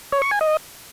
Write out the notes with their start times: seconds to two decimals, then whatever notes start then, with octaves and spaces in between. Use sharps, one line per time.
0.12 C#5
0.22 C#6
0.31 G#5
0.41 D#5